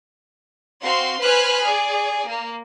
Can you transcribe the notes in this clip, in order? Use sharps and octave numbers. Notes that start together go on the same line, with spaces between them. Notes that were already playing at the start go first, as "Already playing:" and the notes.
C4 F#4 F5 C6
B4 C5 G#5 B5 F6 F#6
G#4 D5
A#3